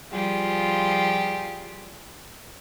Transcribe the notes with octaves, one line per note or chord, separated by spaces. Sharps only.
F3 G3 F4 G4 G#4